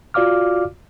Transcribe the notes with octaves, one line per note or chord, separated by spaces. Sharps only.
F4 F#4 D5 F5 D6 F6